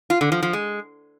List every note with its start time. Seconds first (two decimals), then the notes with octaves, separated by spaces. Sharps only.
0.10 F4
0.21 D3
0.32 F3
0.43 F3
0.53 G#3